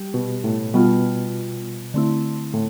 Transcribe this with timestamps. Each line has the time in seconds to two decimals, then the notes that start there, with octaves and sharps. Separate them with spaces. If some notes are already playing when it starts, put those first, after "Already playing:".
Already playing: G3 G4
0.14 B2
0.44 A2
0.74 B2 G3 B3 F4
1.94 D3 A3 C4 E4
2.54 A2